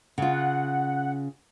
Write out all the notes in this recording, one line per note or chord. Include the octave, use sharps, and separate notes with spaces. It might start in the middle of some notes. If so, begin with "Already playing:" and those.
C#3 F4 F#5